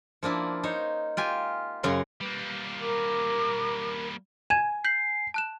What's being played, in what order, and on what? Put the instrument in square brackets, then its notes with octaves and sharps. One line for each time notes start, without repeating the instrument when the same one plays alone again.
[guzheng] F3 A#3 D4 E4
D#4 C5 C#5
F4 G4 G#5
F#2 C#3 C#4 A#5 C6
[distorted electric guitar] G3 A#3 [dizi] B4
[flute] A#4 [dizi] D6
[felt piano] G#5 [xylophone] G#6 D#7 E7
[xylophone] G6 B6 F#7 [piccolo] C7
[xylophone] A5 F#6 E7